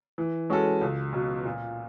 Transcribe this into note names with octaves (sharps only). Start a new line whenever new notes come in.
E3
G#3 C#4 F#4 A4
C#2
B2 F#3
A#2